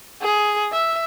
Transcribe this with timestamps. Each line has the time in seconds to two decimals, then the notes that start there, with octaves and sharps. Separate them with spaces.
0.21 G#4
0.72 E5